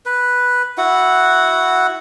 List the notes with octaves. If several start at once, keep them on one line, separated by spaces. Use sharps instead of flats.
B4
E4 F#4 F#5